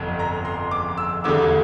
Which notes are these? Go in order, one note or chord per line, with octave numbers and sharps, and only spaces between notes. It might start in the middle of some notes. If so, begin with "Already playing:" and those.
Already playing: G1 F2 C3
A#5
C6
D6
E6
E1 D2 D3 G3 D6